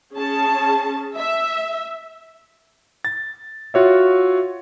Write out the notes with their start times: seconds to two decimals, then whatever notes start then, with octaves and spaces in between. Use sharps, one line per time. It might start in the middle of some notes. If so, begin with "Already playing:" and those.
0.15 C#4 G#4 A5
1.16 E5
3.05 A6
3.74 F4 F#4 C#5 E5